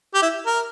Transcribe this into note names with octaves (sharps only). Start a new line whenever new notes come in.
G4
E4
A#4